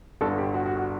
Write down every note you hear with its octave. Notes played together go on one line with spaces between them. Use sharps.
G1 G2 D3 A4
G4
F#4
F#4
F#4